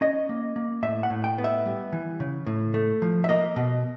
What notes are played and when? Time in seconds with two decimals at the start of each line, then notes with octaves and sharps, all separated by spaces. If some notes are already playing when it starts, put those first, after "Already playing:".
0.01 C#4 D#5
0.29 A#3
0.56 A#3
0.83 A2 E5
1.03 F#5
1.10 A2
1.24 G5
1.38 B3
1.44 E5
1.66 G3
1.93 E3
2.20 C#3
2.46 A2
2.74 A3
3.02 F3
3.24 E5
3.29 A#3 D#5
3.56 B2